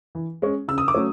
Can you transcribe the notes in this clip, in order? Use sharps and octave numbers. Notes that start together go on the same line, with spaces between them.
E3
G#3 C#4
C#3 E6
D#6
D6
F#3 A3 C#4